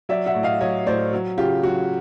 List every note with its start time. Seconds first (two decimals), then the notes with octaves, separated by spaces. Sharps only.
0.09 F#3 D5 E5
0.26 E5 F#5
0.34 A2
0.43 D#5 F5
0.61 F#3 C#5 D#5
0.86 A2 C5 D5
1.13 F#3
1.38 C#3 F4 G4
1.63 F#3 F#4